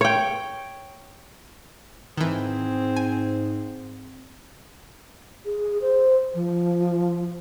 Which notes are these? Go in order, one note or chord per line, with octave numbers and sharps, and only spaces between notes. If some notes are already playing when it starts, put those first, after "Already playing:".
C#5 G5
G#2 D#3 E3 C4 G#4
G#5
G#4
C5
F3